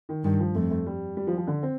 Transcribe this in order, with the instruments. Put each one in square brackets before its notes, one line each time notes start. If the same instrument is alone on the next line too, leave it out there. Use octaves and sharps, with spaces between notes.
[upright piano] D#3
[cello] G2 [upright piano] D#3
[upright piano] F3
[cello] F2 [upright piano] A3
[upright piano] A3
G3
G3
F3
G3
F3
D3
C4